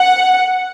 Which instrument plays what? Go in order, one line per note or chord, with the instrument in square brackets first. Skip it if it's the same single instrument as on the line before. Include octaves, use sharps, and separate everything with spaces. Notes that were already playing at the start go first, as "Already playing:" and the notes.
Already playing: [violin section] F#5